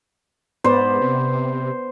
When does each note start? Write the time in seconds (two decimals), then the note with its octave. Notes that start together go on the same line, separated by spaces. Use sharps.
0.64 G#2 B3 B4 C5 D5
1.01 C3